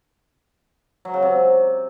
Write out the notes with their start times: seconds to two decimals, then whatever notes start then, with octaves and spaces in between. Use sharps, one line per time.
1.05 F#3
1.14 C#3
1.22 C3